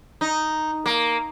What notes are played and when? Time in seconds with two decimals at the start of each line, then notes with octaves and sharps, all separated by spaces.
0.21 D#4
0.86 A#3